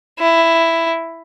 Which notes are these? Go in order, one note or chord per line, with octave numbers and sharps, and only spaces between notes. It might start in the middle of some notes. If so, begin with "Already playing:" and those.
E4